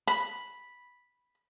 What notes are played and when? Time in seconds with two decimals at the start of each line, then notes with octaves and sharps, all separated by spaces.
0.07 B5